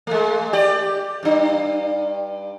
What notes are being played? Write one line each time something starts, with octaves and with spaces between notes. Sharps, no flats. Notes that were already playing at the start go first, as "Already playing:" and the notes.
G#3 A3
G4 D5
G2 D4